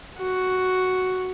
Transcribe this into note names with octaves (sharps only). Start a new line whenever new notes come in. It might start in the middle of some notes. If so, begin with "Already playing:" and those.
F#4